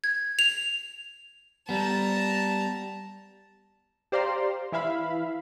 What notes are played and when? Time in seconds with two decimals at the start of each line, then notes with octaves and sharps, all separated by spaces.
0.04 G#6
0.39 F7
1.69 G3 B3 A5 A#5
4.12 G4 C5 D5 F5 A#5 C6
4.72 E3 E4 E5 F5 B5